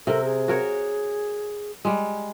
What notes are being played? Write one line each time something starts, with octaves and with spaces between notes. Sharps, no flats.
C3 A4 A#4
G#4
F#4 A#4 C#5
G3 G#3